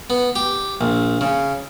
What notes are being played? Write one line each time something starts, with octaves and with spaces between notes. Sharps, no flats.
B3
G4
A#1
C#3